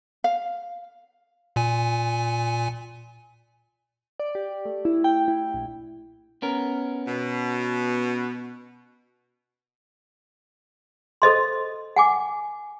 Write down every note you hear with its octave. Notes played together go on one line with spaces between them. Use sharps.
F5
A#2 G#5
D5
G4
A3
E4
G5
E4
A#1
B3 C#4 A#4
B2
A4 C5 D#5 C6
F#5 G#5 D6